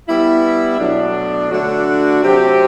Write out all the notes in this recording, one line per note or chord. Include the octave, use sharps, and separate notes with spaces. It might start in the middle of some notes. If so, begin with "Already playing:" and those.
G3 B3 E4
B2 F#3 A3 D4
D3 A3 D4 F#4
C3 F#3 C4 G4